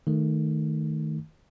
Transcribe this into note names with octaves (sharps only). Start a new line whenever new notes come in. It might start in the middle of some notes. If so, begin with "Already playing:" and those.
D#3 A3